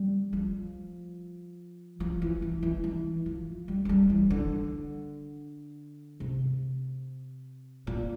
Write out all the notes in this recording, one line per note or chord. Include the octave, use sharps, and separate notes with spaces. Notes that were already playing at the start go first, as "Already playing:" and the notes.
Already playing: G3
F3
F3
E3
E3
E3
E3
F3
G3
F3
G3
E3
D3
C3
A#2